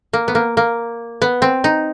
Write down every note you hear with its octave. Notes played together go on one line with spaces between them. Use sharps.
A#3
B3
A#3
A#3
B3
C4
D#4